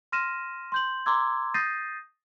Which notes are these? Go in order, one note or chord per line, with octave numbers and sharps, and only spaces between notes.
C6 F6 A#6 D#7 E7
C6 G6 F#7
A#5 C6 D6 E6 G#6
D#6 G6 A6 A#6 C7 D#7